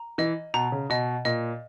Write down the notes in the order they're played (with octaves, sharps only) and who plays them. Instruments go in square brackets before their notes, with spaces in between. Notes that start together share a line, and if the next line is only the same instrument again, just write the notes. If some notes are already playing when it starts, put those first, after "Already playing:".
Already playing: [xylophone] A#5
[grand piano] E3 [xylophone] D#5
[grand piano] B2 [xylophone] A#5
[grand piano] C#3
[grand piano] B2 [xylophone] D#5
[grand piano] A#2 [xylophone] D#5